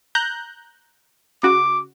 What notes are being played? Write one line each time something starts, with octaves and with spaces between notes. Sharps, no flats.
A#5 F#6 G6
C#3 F#4 D6